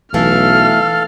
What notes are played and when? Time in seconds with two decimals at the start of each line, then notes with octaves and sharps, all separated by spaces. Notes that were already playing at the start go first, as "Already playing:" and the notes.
0.14 B1 E3 A3 A4 F5 F6